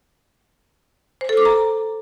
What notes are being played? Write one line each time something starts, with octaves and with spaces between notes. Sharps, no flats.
C5
A4
D6
A#5